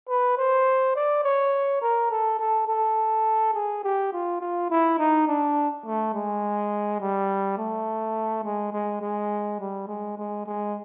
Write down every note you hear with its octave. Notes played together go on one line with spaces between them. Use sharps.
B4
C5
D5
C#5
A#4
A4
A4
A4
G#4
G4
F4
F4
E4
D#4
D4
A3
G#3
G3
A3
G#3
G#3
G#3
G3
G#3
G#3
G#3